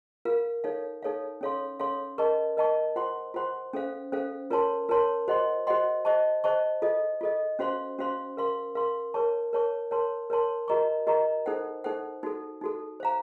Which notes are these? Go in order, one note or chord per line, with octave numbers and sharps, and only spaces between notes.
F4 A#4 F5
D#4 A4 C#5 F5
D#4 A4 C#5 F5
C#4 A4 C#5 F5 C6
C#4 A4 C#5 F5 C6
A#4 D#5 A5 C#6
A#4 D#5 A5 C#6
F4 C5 F#5 C6
F4 C5 F#5 C6
C#4 A4 C5 F5
C#4 A4 C5 F5
F4 A#4 C#5 A5 C6
F4 A#4 C#5 A5 C6
F#4 C5 D#5 F#5 C6
F#4 C5 D#5 F#5 C6
C5 D#5 A5 C#6
C5 D#5 A5 C#6
F4 A4 D#5
F4 A4 D#5
C#4 F#4 C5 F5 C6
C#4 F#4 C5 F5 C6
A#4 F5 C6
A#4 F5 C6
A#4 C#5 A5 C#6
A#4 C#5 A5 C#6
A#4 C#5 A5 C6
A#4 C#5 A5 C6
F#4 A#4 D#5 A#5 C#6
F#4 A#4 D#5 A#5 C#6
D#4 A4 C5 F#5
D#4 A4 C5 F#5
D#4 F#4 A4
D#4 F#4 A4
C5 F5 A#5